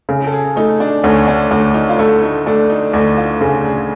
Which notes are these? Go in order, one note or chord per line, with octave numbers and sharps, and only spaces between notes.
C#3
A4
G#4
A3 D#4
D4
D2 C#4
D4
D2 D4
D#4
F4
A3 E4
D#4
A3 D4
D#4
D2 E4
F4
C#3
G#4